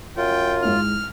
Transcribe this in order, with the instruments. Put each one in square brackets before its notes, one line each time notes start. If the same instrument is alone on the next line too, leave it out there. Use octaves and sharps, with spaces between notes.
[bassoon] F#2 [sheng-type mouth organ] F4 [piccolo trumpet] G5
[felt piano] G#2 G#3 E4 [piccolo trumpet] F6